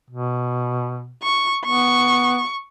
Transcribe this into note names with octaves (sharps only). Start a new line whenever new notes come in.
B2
C#6
B3 C#6